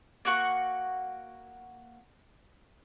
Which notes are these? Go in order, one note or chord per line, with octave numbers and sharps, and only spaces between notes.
A#3 F#4 F#5 C#6